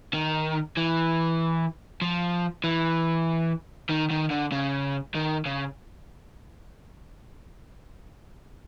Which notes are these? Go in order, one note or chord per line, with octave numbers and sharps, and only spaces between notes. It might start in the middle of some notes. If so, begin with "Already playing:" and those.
D#3
E3
F3
E3
D#3
D#3
D3
C#3
D#3
C#3